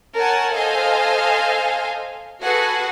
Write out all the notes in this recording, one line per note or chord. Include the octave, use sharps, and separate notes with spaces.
A#4 C#5 F#5 G#5 A5
A4 C5 D#5 F5 G#5
F#4 G#4 A4 B4 F#5